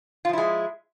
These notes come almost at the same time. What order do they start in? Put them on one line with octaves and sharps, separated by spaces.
F4 F3 E4 G#3